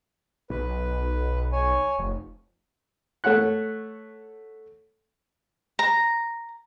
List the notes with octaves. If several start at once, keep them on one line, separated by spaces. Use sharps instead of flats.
B1 B4
C#5 G#5
F1
A3 C#5 F#5 F#6
A#5